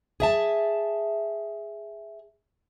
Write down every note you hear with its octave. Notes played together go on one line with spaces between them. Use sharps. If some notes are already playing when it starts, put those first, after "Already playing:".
G#4 E5 A5